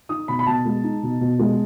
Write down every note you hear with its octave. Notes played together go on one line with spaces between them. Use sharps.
D#4 D#6
B2 B5
B5
B2 A5
G#3
D#4
B2
B2
G#3